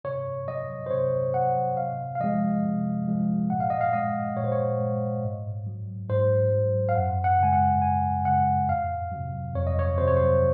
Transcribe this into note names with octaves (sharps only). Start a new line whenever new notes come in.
C3 C#5
F#3 D#5
C5
C3 C#5
F#3 F#5
C3 F5
F5
F3 G#3 D#5
C3
F3 G#3
A#2 F#5
F5
D#5
F5
G#3 D#5
A#2 C#5
C5
C#5
G#3
G#2
F#3
G#2 C5
F#3
F5
F#2 F#5
F#5
C#3 G#3 G#5
F#5
F#2 G#5
C#3 G#3 F#5
F2 F5
C3 F#3
F2 C#5
D#5
C#5
C3 F#3 C5
C#5
C5